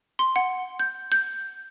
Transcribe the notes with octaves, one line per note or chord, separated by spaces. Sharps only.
C6
F#5
G6
G6